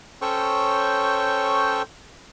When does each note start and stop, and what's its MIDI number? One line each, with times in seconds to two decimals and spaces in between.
0.22 1.82 61
0.22 1.82 69
0.22 1.82 72
0.22 1.82 73
0.22 1.82 79
0.22 1.82 85